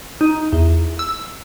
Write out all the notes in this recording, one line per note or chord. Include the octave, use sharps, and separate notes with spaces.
D#4
E2
E6